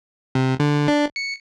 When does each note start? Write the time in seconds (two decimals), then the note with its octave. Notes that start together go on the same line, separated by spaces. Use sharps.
0.35 C3
0.60 D3
0.88 D4
1.16 C#7